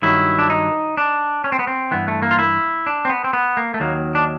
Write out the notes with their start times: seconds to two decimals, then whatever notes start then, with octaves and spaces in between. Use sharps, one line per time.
0.02 G2 D#3 F#3 E4
0.39 D4
0.50 D#4
0.97 D4
1.44 C#4
1.52 C4
1.59 B3
1.67 C4
1.91 G2 E3 B3
2.08 A3
2.22 A#3
2.31 F4
2.39 E4
2.87 D4
3.05 C4
3.10 B3
3.24 C4
3.33 B3
3.57 A#3
3.74 A3
3.80 D#2 D#3 F#3 A#3
4.15 D4